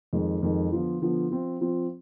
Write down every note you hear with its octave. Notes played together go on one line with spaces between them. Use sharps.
F2 D#3 G#3
F2 D#3 G#3
D3 F3 B3 F4
D3 F3 B3 F4
F3 C4 F4
F3 C4 F4